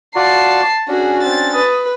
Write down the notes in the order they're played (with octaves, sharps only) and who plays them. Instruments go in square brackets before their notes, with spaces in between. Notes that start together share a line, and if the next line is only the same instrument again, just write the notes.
[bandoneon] F4 F#4 D5 [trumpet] A5 [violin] C7
[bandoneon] C#4 D4 [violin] F#4 G#4
[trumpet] C4 [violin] A6
[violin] B4 [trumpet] D#6